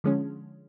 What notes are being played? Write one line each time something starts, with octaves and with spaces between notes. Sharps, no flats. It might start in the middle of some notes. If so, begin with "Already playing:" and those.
D3 F3 G#3 C#4